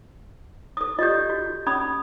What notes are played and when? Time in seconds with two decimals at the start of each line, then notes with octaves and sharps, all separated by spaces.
0.77 A4 D#6
0.99 F4 G4 D5 D#5 G6
1.30 F#4
1.67 C#4 B5 D#6 G#6